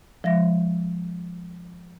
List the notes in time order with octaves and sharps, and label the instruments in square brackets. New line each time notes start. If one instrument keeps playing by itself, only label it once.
[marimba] F3 G#3 E5 A#6